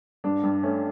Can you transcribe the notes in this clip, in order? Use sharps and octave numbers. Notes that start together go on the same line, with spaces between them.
G2 D4
G2
A3 C#4